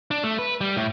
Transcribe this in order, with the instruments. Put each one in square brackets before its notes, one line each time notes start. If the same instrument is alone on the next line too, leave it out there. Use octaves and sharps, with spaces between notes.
[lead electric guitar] D4
A3
B4
G3
A2